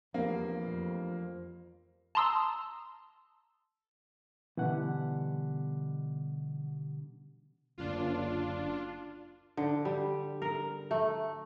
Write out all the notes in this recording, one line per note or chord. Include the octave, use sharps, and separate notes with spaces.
E2 F3 G3 A3 A#3 C4 D4
F2
A5 A#5 C6 D#6 E6
B2 D3 E3 G3 F#5
F#1 D2 D4 F4
D3
G3
A#4
A3